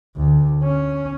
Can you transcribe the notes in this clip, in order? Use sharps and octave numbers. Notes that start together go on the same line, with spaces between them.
D2
C#4